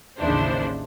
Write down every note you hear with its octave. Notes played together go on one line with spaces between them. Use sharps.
A1 D#2 C#3 D4 E4 C5